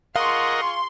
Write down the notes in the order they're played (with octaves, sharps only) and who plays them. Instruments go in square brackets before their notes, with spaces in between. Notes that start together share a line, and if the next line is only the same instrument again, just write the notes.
[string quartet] F4 G#4 C#6 [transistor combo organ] A#4 D#5 F#5 [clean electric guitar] F5 [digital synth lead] C6